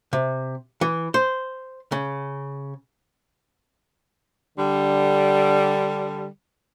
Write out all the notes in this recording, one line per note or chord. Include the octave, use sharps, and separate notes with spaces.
C3
E3
C5
C#3
D3 G3